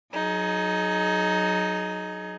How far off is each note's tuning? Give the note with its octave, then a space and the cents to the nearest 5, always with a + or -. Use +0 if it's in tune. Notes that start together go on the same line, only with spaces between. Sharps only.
F#3 -15 D#4 +0 G#4 +30